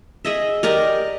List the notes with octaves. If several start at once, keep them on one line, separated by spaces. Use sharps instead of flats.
G#4 D#5 E5
G4 A#4 D5 D#5